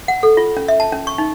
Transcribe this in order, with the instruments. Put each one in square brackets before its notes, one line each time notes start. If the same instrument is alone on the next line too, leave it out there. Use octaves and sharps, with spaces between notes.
[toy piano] F#5
A4
F4
C#4
E5
A5
C#4
C#6
D#4